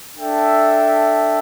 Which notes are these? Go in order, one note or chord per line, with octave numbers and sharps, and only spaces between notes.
D4 A4 E5 G5